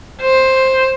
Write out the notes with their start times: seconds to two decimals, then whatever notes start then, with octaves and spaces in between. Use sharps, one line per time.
0.22 C5